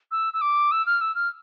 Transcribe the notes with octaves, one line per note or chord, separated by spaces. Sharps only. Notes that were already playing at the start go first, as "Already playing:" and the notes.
E6
E6
D6
E6
F6
E6
F6